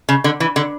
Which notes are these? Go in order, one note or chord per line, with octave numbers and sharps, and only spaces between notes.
C#3
D3
E3
D3